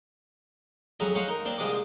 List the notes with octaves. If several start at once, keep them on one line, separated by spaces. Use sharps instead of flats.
F2 F#3 E4 G#4 A#5
G#4 C5 C#5 D#5 F5 F#5
D#4 A#4
A#3 C4 D4
C2 F3 G#3 D4 D#5 D6